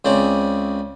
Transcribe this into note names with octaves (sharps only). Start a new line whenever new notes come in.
C#2 C#3 C4 D5